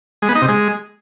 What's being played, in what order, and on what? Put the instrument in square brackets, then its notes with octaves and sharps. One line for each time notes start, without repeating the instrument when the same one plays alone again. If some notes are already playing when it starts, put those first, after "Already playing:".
[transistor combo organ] G#3
B3
D#4
C3
G#3